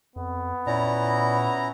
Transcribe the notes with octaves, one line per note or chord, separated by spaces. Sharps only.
F2 B3
A#2 C#4 E4 D5 A#5